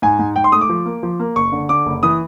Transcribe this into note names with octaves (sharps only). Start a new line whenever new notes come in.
G#2 G#5
G#2
G#2 G5
C6
A3 D#6
D6
F3
A#3
F3
A#3
F#1 C#6
D3
D3 D6
F#1
E3 D#6